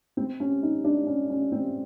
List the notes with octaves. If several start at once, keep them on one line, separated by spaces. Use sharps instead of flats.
C4
C#4
D#4
D4
C#4
C#4
C4